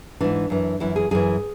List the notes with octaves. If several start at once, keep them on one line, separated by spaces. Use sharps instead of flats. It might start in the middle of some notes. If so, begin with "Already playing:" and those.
G#2 E3 D4
F#2 E3
F#2 E3 E4
G#4
F#2 E3 G#4